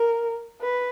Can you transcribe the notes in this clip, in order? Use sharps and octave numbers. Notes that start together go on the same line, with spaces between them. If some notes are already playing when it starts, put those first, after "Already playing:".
Already playing: A#4
B4